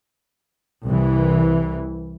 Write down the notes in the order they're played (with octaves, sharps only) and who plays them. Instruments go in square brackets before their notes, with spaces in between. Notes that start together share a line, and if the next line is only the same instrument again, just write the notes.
[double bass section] C2 E3